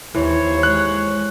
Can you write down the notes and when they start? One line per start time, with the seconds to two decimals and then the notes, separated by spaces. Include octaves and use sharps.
0.15 D#2 E3 C5 C#5
0.63 G#3 F#6